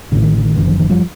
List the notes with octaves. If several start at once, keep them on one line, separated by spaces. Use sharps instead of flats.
A1 A2 D3
D#3
D3
D#3
F#1 F#2 D3 E3
D#3 F3
D#3 F3
F3 G3